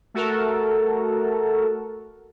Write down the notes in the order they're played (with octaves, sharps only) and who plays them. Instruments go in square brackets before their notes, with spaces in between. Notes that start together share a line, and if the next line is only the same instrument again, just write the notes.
[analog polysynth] A3 F#4 A4 A#4